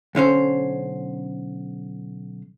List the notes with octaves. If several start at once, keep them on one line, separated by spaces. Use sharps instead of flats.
B1 D3 C#4 C5